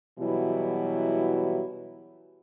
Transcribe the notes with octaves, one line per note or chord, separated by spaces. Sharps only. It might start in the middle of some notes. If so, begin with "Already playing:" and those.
B2 E3 F#3 G3 E4